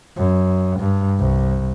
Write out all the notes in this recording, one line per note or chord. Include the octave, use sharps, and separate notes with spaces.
F#2
G2
C2